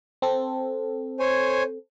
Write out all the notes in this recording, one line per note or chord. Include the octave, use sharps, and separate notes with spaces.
C4 A4
C5 C#5 G#5